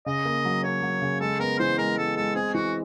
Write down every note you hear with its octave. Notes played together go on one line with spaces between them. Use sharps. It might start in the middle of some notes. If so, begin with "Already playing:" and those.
C#3 D#5
A#3
F#3
A#3 C#5
F#3
C#3
G#3 A4
B3 A#4
E3 C5
G#3 A#4
G#3 A4
G#3 A4
C4 G#4
E3 F#4